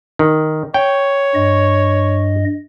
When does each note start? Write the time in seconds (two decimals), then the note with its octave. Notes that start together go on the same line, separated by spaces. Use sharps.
0.19 D#3
0.74 C#5 G5
1.35 G2 D#5